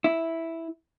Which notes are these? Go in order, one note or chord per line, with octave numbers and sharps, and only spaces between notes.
E4